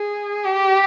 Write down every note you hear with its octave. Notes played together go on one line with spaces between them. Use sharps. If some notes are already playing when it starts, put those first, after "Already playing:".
Already playing: G#4
G4